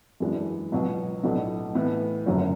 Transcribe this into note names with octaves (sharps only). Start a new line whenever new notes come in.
F#2 E3 G#3 D4 F#4
C#2 B2 F#3
B1 A2 F#3 A3 D4
A2 E3 B3
F#1 F#2 D3 F#3 C#4